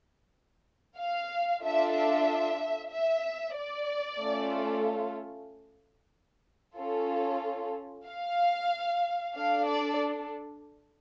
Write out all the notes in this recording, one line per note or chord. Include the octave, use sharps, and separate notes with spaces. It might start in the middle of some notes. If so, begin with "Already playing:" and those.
F5
D4 F4 A4 E5
E5
E5
D5
A3 C#4 F4 A4
C#4 F4 A4
F5
D4 A4 F5
D5